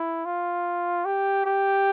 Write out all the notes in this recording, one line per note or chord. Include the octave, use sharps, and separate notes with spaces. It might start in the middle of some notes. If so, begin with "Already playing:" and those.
Already playing: E4
F4
G4
G4